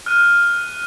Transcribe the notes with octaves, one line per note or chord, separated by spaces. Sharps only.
F6 F#6 D#7